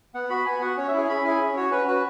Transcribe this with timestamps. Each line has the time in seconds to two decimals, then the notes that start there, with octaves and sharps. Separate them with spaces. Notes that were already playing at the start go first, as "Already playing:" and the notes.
0.14 B3 F#5
0.30 F#4 B5
0.46 B3 G#5
0.62 F#4 F#5
0.77 C#4 C#5
0.88 E5
0.93 E4 G#4 G#5
1.08 C#4 B5
1.25 E4 G#4 G#5
1.40 C#4
1.56 F#4 C#5
1.71 C#4 B4
1.87 F#4 B4